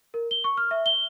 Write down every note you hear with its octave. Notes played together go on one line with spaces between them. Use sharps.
A#4
G7
C#6
F6
E5
G7